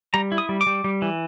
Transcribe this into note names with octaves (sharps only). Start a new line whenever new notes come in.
G3 A#5
E4
D#6
G3
D6
G3
G3
E3